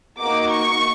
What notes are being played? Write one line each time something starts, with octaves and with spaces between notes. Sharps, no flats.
A#3 D#4 F#4 D6
C#6